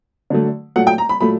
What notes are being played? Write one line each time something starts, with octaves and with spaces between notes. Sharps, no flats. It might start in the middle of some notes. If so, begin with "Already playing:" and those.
D3 F#3 A3
A#2 F#3 A3 F#5
G5
A#5
B5
A#2 F#3 A3 B5